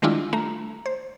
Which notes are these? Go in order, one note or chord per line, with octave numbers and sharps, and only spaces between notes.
D#3 G3 G#3 D4 E4 F4
A3 A#5
C5